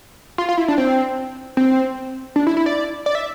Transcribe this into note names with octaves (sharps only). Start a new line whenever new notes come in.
F4
F4
E4
D4
C4
C4
D4
E4
E4
D5
D5
E5